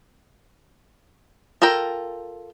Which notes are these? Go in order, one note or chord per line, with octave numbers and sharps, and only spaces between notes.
F4 A4 A#4 G5